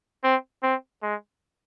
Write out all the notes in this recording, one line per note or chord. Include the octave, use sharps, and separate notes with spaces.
C4
C4
G#3